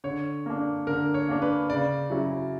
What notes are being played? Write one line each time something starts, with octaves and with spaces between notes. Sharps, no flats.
D3 C#5
A#3 D4
D3 A#4
C#5
A#3 D4
B4
C#3 D5
F#3 C#4 E4